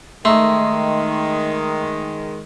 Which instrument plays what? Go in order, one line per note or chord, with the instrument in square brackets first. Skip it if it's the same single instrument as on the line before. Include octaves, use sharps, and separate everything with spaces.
[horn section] D#3 G#3 [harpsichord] A3 [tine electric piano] D#5 A#5 C6